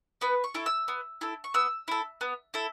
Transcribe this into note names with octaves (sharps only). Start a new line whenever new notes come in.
B3 B4
C#6
E4 A4
E6
B3
E4 A4
C#6
B3 E6
E4 A4
B3
E4 A4